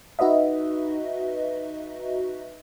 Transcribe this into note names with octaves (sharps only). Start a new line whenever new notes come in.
D#4 F#4 B4 D#5 E5